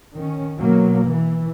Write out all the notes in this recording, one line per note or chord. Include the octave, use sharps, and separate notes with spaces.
D#3 C#4
B2 F#3 A#3
E3